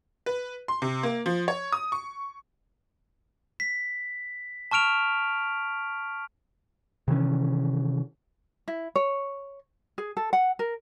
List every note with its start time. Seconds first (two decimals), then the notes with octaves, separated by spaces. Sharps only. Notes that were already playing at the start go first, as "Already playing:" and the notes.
0.26 B4
0.68 C6
0.82 C3
1.03 A#3
1.26 F3
1.48 C#5
1.72 D#6
1.92 C#6
3.60 B6
4.71 A5 C#6 F6 D7 F7
7.08 C3 D#3 E3 C#4
8.68 E4
8.96 C#5
9.98 G#4
10.17 A4
10.33 F#5
10.59 A#4